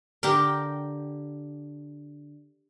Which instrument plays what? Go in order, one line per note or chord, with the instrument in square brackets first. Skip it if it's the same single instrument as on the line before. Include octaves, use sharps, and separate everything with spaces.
[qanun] D3 G5 [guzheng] G4 A#4